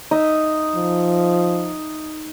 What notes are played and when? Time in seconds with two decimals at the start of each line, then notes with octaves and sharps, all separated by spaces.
0.11 D#4 D#5 E5
0.76 F3